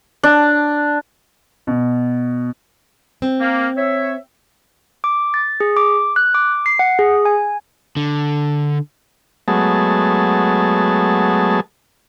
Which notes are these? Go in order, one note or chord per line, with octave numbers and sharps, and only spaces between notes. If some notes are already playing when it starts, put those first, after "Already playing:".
D4
B2
C4
A#3
C#5 E5
D6
A6
G#4
D6
F#6
D6
C7
F#5
G#4
G#5
D3
F#3 G#3 A3 B3 G#4 A5